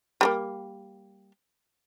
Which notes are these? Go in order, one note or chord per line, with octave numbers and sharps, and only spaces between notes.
G3 A3 A#3